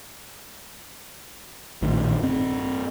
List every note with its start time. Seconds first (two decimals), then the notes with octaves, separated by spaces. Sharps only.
1.82 A#1 A2 D#3
2.23 G2 C4